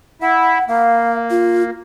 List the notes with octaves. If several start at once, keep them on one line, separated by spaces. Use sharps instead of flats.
E4 E5 F#5
A#3 F5
F4